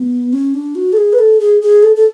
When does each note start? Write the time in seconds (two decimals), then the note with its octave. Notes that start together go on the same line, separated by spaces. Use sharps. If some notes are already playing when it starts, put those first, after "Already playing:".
Already playing: B3
0.33 C#4
0.54 D4
0.75 F#4
0.93 A4
0.97 G#4
1.13 B4
1.19 A4
1.40 G#4
1.62 G#4
1.83 A4
1.96 A4